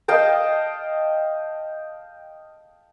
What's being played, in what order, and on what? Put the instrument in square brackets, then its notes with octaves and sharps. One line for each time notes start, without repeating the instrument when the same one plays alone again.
[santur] D#5 F5 G5 A5